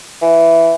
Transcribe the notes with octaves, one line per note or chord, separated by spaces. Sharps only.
E3